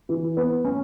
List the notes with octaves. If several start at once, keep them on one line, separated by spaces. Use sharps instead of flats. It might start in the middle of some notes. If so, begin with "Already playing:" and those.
E3
B3
C#4